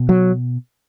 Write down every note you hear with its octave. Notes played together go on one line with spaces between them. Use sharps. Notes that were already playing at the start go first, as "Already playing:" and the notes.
Already playing: B2
F#3